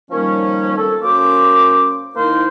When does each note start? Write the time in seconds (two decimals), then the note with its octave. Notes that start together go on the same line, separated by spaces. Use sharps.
0.10 D#3 F3 G3 A#3 C#4
0.77 A4
1.03 F#3 A#3 C#4 A#4 C5 D6
2.16 D#3 A#3 D#4 E4 A#4 C5